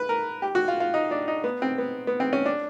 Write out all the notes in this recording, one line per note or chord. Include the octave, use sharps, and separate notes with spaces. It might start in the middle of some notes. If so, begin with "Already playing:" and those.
Already playing: B4
A#4
G4
F#4
F4
F4
D#4
D4
D#4
B3
C4
B3
B3
C4
C#4
D4